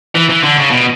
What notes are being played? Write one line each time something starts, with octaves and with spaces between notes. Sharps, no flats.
E3
E3
D3
C#3
B2